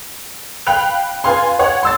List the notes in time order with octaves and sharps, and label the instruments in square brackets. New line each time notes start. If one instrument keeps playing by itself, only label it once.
[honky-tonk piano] F5 G5 B5 F#6 F7
F4 B4 F5 G#5 C6
C#5 F#5
C6 E6 A6